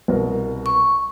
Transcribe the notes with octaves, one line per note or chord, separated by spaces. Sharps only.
C2 B2 A#4
C#6